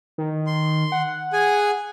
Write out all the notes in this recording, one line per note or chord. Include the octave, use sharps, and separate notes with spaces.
D#3
C6
F#5
G#4 G#5